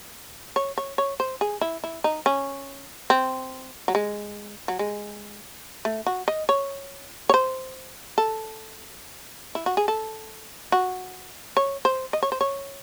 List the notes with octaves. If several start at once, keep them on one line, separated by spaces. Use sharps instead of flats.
C#5
C#5
C#5
C5
G#4
E4
E4
D#4
C#4
C4
F#3
G#3
F#3
G#3
A3
F#4
D#5
C#5
C#5
C5
A4
E4
F#4
G#4
A4
F#4
C#5
C5
D#5
C#5
C5
C#5